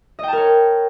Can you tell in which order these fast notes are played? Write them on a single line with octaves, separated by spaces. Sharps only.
D#5 G5 A5 A#4 C#5